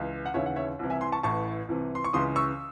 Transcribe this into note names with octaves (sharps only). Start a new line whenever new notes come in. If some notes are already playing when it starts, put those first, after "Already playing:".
Already playing: C#2 E3
F#5
D#2 C#3 E3 C#5 E5
F#5
C#5 E5
C2 C3 E3
E5 G#5
G#5 C6
A5 C#6
A1 A2 E3 A5 C#6
C2 C3 E3
C6
C#6
C#2 C#3 E3 C6 D#6
C#6 E6